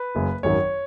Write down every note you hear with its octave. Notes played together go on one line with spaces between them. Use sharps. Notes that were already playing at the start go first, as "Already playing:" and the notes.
Already playing: B4
F#1 F#2 C#3
G#1 F#2 D#3 F#3 C#5